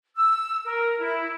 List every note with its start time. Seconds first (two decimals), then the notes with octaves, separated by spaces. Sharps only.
0.16 E6
0.65 A#4
1.00 E4